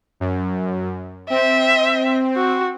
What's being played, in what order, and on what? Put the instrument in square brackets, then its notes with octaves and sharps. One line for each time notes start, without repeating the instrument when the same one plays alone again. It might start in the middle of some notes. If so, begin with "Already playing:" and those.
[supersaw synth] F#2
[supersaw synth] C4 [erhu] E5
[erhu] F#4